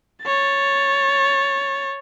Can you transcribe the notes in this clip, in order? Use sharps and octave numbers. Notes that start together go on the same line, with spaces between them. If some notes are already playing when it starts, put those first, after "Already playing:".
C#5 A6